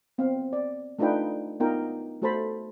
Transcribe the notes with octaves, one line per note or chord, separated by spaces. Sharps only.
B3 C4 F5
D5
A3 D4 D#4 F4 B4 G5
B3 D#4 F4 A#4 G5
A3 F#4 A4 C5 A5 B5